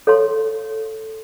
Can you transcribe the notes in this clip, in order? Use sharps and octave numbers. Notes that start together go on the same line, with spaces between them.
A4 C#5 F5 C6